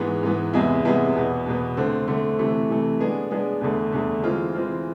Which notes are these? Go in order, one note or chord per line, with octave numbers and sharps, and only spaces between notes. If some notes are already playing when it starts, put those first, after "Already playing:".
Already playing: G#2 E3 B3
G#2 E3 B3
E2 C3 G#3 B3 E4
E2 C3 G#3 B3 E4
E2 B2 B3
E2 B2 B3
D3 A3 C4
D3 A3 C4
C3 E3 A3
C3 E3 A3
G#3 B3 D4 G#4 D5
G#3 B3 D4 G#4 D5
E2 D3 A3
E2 D3 A3
E3 G#3 C4 F4
E3 G#3 C4 F4